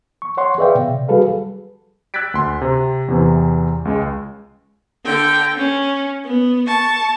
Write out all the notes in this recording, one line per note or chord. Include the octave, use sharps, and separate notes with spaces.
C#6
C#5 F#5 C6 C#6
G#4 B4 D5 E5 F5 G5
B2
C3
G3 F#4 G#4 A4 B4 F5
E6 F#6 G#6 A6 B6 D7
D2 C6
C3
E2 C3 E3
C#2 G#3
D3 G5
C#4
B3
A5 C#6